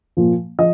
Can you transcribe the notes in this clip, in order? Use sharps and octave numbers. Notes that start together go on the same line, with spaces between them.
A#2 F3
F3 D#5